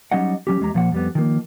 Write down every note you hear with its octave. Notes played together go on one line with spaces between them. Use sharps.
F#3 G3 C#4 D#4 D#5 F#5
F#3 C#4 G4
E2 G#3 G4 A#5
A#2 F3 F#5
F2 G3 B3
D#3 F3 A#3